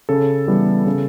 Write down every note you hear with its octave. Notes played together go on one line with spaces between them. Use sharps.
C#3 A4
E3 G3 B3
C#3